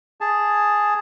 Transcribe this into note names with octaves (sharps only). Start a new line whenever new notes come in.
G#4 A5